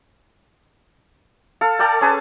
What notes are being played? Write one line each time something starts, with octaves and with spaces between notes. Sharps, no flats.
A4 F5
A4 D5 G5 A5
C#4 G#4 B4 A5